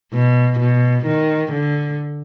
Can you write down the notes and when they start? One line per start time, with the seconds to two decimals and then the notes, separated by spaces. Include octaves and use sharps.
0.13 B2
0.59 B2
1.06 D#3
1.52 D3